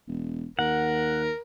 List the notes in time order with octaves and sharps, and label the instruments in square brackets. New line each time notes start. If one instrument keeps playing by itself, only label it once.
[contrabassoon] E1
[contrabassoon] D#2 [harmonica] A#4 [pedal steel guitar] F#5